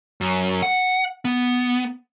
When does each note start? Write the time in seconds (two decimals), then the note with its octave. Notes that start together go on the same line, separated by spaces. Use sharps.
0.21 F#2
0.63 F#5
1.25 B3